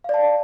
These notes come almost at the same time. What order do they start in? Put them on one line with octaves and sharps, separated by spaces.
F5 D5 A5